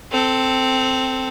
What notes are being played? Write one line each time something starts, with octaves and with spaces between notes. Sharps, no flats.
C4 A4